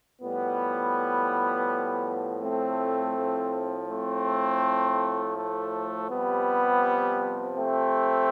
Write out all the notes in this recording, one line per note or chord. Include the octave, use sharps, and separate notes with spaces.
A2 F3 G3 B3
A3 C4
A2 F3
A3 C4
A3
C3 F3 G3 B3
A3 C4